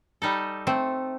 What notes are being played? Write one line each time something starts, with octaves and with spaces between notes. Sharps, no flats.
G3 D#4 A4
A3 C4